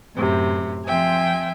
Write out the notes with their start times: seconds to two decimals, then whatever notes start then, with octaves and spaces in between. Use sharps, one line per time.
0.15 F#2 A2 C3
0.86 F3 C4 E5 G5 G#5